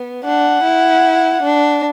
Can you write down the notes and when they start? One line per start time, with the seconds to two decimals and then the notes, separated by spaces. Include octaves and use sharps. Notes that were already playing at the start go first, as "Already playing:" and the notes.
Already playing: B3
0.25 D4 F#5
0.64 E4
1.42 D4